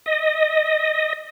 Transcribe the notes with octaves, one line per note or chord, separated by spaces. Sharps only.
D#5